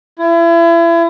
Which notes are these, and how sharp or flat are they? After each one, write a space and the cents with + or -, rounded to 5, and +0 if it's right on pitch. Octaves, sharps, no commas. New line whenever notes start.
E4 +35